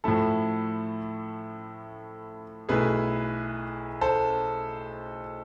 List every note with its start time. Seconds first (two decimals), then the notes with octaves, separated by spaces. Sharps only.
0.04 A2 F3 A3 E4 A4
2.69 B1 B2 A3 E4 G#4 B4
4.01 A4 C5